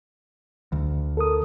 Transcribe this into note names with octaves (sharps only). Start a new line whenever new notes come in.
D2
A4 A#4 D#6